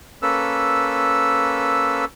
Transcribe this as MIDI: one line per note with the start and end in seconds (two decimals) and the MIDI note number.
0.22 2.05 58
0.22 2.05 61
0.22 2.05 69
0.22 2.05 71
0.22 2.05 88